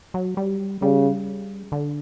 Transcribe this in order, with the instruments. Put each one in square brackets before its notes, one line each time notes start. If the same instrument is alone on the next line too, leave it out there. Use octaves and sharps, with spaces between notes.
[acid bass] F#3
G3
[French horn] C#3 [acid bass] G3
[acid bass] D3